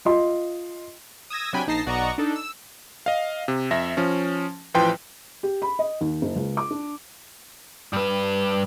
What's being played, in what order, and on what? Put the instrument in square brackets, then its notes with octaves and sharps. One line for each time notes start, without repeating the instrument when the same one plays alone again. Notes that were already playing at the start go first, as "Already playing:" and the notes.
[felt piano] F4 D#5 C6
[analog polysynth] D#6 E6 G#6 A#6
C3 F#3 D4 G5 G#5 B5
A#1 D#4 A5 A#6 C7
B1 F#4 D5 D#5 A#5 C#6
D4 D#4 A4
E6
[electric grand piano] D#5 F5
C3
F2 E5 A#6
F3 C#4
A1 E3 F3 B4 G5 C6
[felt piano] G4
B5
D#5
D#2
F#1
C#2
D6
D4
[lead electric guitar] G2 B4